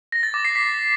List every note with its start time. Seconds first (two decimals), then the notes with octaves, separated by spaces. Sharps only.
0.12 A#6
0.23 A6
0.34 D6
0.45 C7
0.55 B6